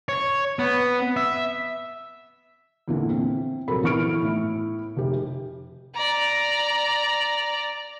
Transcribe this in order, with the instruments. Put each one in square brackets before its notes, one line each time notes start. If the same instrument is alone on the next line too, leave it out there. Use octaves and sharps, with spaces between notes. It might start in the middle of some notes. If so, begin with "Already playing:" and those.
[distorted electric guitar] C#5
B3
E5
[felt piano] E2 A#2 D3 E3
C4
A#1 C3 F#3 A4 A#4 B5
E3 B3 C#6 F6 D7
A2 E4
F1 G4
[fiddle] D5 A#5